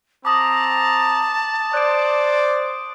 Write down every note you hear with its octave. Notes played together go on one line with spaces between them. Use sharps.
C4 A5 A#5 D6 D#6
C5 D5 F#6 D7